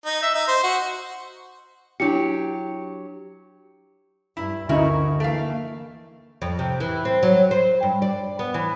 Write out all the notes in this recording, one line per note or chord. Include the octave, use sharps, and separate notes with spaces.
D#4
E5
D#4
C5
F#4
F#3 D4 E4 G4 C#7
G2 E4
D2 D3 C#4 D#4 E4 F#4 A#4
E3 A3 A#3 F5
F2
C3
E3
C4
F#3
C5
G2
D5
B3
E3